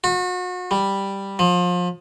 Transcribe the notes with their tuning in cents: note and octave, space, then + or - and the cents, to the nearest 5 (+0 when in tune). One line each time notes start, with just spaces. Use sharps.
F#4 -35
G3 +0
F3 +30